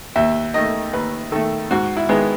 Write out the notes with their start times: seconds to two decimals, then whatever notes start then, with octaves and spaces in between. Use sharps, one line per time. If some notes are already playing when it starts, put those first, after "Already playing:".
0.16 D#2 E5
0.54 D#3 A3 D#5
0.93 D#2 B4
1.32 D#3 A3 A4
1.71 G#2 F#4
1.97 E4
2.09 D#3 G#3 B3